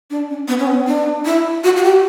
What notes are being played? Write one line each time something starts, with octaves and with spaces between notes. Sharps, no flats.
D4
C#4
B3
C#4
B3
D4
E4
F#4
F#4
G4